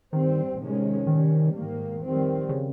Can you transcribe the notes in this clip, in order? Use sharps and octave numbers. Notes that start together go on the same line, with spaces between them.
G2 D#3 G3 C4
C3 D#3 G#3 C#4
C3 D#3 G3 C#4
G#2 D#3 A#3
F2 D#3 G3 C4
C#3